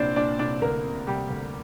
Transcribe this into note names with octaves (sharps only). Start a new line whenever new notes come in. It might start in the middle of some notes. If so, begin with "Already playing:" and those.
Already playing: C2 A#2 C4 D4 C5 D5
A#2 D4 D5
C2 D4 D5
D2 A#3 A#4
C3
C3 G3 G4
D2